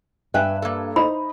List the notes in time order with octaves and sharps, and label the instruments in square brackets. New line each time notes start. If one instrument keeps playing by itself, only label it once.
[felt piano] G2 [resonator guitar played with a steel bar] B4 G5 G#5 [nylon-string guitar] E5
[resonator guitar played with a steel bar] A#3 A4
[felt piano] D#4 C5 D#5 [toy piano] B5